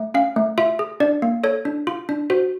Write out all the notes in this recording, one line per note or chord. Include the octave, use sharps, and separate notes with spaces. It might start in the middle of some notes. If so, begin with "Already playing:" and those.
Already playing: A3
C#4 F5
A3
F4 E5
G#4
D4 D5
A#3
A4 C#5
D4
F4
D4
F#4 C5